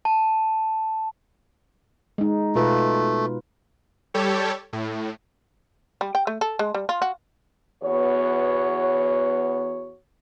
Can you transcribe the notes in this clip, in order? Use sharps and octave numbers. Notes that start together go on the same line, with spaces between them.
A5
G#3 D#4
B2 A3 F4 B4
G3 G4 A4 C#5
A2
G3
G5
A3
A4
G#3
G3
F4
F#4
E2 B3 F#4 C#5